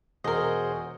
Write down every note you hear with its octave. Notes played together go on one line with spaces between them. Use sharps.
E1 F#4 G#4 A#4 C5 D#5